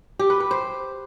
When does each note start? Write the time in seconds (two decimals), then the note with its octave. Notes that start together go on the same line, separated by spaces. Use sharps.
0.19 G4
0.30 B4
0.40 B4
0.51 C5